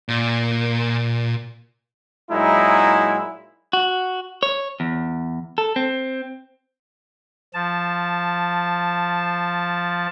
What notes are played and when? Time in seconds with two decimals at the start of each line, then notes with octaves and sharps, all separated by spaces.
0.09 A#2
2.30 A#2 F#3 G#3 D#4 E4
3.73 F#4
4.43 C#5
4.80 E2
5.58 A4
5.76 C4
7.54 F3 A5